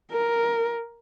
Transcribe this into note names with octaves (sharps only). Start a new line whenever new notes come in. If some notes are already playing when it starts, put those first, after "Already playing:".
A#4